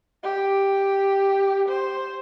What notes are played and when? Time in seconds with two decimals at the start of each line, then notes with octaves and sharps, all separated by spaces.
0.23 G4
1.68 C5